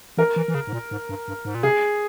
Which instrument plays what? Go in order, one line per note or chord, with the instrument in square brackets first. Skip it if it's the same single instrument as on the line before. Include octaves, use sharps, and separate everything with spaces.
[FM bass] E3 [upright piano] A#4
[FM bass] E3
E3
C#3
G#2
A#2
G#2
G2
G2
G#2
A#2
[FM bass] C3 [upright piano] G#4